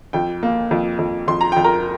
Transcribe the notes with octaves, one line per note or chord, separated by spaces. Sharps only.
F2 G5
A#3
F2
F2
F2 C6
A#5
F2 G5
A#4 A#5